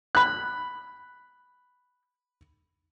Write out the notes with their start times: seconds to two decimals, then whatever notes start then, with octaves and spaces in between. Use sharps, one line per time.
0.15 B5 F#6